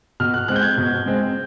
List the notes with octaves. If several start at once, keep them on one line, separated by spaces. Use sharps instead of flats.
B2 F6
F#6
G#3 C4 F#6
G6
G#6
B2
G#3 C4